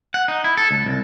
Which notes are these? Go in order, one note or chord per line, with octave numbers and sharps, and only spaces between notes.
F#5
D#4
E4
A4
C#2
C2